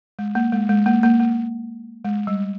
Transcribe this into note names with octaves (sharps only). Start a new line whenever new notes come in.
G#3
A#3
G#3
G#3
A#3
A#3
A#3
G#3
G3